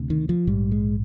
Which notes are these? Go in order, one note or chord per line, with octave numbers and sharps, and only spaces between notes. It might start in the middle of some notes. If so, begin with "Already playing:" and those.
Already playing: D2 C3
D#3
F3
A#1 G#2 G3
G#3